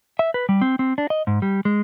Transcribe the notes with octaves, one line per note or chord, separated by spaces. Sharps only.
E5
B4
G3
C4
C4
D4
D#5
G#2
G3
G#3